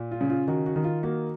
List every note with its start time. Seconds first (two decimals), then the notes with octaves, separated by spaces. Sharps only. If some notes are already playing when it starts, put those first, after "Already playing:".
Already playing: A#2
0.11 F4
0.21 C#3
0.30 F4
0.48 D#3 F#4
0.66 F#4
0.76 D#3
0.84 F4
1.03 A#3 F#4